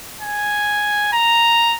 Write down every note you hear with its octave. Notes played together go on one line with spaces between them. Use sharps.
G#5
A#5